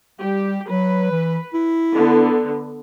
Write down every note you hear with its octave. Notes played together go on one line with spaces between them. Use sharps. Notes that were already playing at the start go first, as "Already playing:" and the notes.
G3 G4
F#3 B4
E3
E4
D3 B3